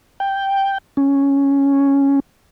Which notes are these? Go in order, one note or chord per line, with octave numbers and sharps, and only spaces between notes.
G5
C#4